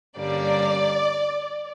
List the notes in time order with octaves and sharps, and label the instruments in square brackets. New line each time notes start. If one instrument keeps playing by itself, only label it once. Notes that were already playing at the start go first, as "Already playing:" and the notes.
[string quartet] G2 D3 G3 A#3 C#4 [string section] D5